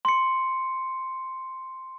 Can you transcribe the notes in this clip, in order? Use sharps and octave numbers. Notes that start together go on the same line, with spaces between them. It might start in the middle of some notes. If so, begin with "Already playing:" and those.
C6 C#7